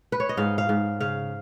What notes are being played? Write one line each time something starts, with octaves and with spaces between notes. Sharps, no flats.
B4
C#5
D#5
G#2 F5
F5
G#2
C#3 F5